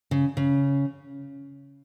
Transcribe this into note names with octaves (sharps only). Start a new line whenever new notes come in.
C#3
C#3